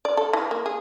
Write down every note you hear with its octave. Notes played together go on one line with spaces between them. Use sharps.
D5
A4
E3
A#3
G#4